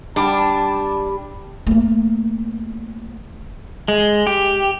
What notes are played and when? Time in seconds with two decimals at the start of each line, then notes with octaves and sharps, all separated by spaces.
0.16 G3 D4 A5
1.67 A3 A#3
3.88 G#3
4.27 G4